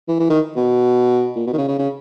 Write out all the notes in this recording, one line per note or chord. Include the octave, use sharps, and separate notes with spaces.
E3
E3
D#3
B2
A#2
B2
D#3
C#3
C#3
C#3